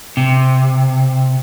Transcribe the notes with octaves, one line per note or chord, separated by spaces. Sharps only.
C3